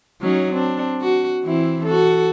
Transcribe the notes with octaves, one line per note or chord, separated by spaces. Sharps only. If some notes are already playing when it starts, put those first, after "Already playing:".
F#3 C#4 D#4
C4 D4
F#4
E3 C4 E4
F#4 A4